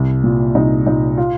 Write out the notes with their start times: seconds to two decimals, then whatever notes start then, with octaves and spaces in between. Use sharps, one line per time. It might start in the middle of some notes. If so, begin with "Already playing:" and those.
Already playing: C2
0.24 A#2
0.55 C2 D#4
0.87 A#2 D#4
1.18 F4